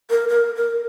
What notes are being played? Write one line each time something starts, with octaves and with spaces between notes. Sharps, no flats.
A#4
A#4
A#4